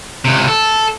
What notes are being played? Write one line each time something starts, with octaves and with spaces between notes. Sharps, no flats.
C#2 C3
A4